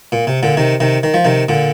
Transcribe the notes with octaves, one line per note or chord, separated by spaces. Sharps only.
A#2
C3
A#2 D3
C3 D#3
C3 D#3
D#3
F3
C3 D#3
A#2 D3